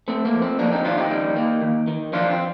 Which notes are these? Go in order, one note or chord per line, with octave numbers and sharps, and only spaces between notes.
A3 C4
A#3
F2
C4
F2 A#3 D4
C4 D#4
D#3 D4 F4
D#4 G4
G3
A#3
D#2
D#3
F3 D4 F4
C4